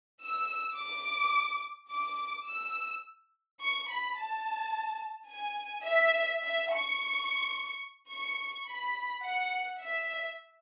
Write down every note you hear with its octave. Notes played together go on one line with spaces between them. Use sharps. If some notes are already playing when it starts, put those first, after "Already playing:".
E6
D6
D6
E6
C#6
B5
A5
G#5
E5
E5
C#6
C#6
B5
F#5
E5